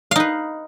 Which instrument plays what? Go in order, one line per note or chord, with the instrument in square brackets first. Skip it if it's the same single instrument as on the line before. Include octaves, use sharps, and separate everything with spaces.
[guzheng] F5
D#4
B4